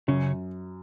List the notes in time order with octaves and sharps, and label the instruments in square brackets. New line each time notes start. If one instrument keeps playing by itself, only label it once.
[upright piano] F#2 [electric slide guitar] C#3 C#4